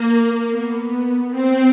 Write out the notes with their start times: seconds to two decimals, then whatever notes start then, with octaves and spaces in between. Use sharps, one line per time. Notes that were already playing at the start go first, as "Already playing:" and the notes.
Already playing: A#3
0.54 B3
1.34 C4